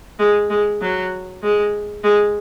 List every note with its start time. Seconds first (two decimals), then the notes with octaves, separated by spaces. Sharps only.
0.19 G#3
0.50 G#3
0.82 F#3
1.43 G#3
2.04 G#3